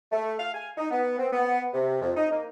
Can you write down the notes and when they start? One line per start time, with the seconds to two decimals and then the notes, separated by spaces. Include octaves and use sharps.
0.12 A3
0.39 F5
0.54 G#5
0.77 D#4
0.91 B3
1.19 C4
1.33 B3
1.74 C3
2.02 F2
2.17 D#4
2.32 A#3